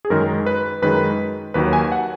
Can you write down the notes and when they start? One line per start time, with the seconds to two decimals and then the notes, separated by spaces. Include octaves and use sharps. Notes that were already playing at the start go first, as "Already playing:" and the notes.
0.05 G#4
0.10 F#2 D#3 G#3 A#4
0.46 B4
0.82 F#2 D#3 G#3 B4
1.54 D#2 D#3 F#3 B4
1.73 G#5
1.92 F#5